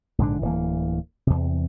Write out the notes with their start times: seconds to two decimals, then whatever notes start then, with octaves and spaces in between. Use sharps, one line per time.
0.18 A#1 G#2 D3 D4
0.41 D1 E3 A#3
1.27 E2 C3